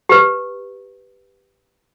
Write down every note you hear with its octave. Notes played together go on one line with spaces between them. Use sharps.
G4 B4